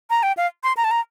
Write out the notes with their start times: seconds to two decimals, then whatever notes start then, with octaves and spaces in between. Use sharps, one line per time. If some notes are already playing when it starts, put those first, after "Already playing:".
0.10 A#5
0.23 G5
0.37 F5
0.64 C6
0.77 A#5
0.84 A5
0.91 A#5